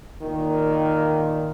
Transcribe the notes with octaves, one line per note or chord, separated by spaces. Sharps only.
A#2 D#3